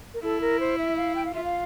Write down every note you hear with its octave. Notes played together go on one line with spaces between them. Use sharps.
A#4
E4 A4
A#4
C5
E5
F5
G5
F5
F4 E5
F5